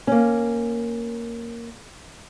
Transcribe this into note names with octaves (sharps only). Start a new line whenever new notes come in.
A#3 C#4